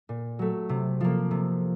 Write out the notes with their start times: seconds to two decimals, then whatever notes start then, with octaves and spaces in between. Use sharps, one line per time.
0.09 A#2
0.39 F#3 A3
0.69 C3
1.01 F3 A#3
1.31 C3